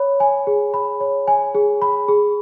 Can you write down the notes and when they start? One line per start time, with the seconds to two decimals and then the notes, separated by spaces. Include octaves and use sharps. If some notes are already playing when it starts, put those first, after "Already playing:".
Already playing: C#5 B5
0.20 G#5
0.47 G#4
0.74 B5
1.01 C#5
1.28 G#5
1.55 G#4
1.82 B5
2.08 G#4